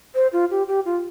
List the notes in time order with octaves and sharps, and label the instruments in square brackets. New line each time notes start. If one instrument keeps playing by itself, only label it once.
[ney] C5
F4
G4
G4
F4